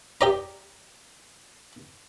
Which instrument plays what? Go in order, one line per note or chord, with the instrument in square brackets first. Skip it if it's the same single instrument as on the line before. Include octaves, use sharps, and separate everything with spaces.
[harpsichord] G4 D5 A#5